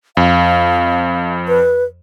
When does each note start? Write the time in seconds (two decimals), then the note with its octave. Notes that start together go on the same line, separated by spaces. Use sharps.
0.17 F2 F5
1.48 B4